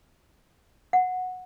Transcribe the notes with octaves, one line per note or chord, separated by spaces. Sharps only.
F#5